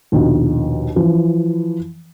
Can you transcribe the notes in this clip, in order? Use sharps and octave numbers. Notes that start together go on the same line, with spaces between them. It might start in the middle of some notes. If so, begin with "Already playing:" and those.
A#1 D#2 B2
E3 F3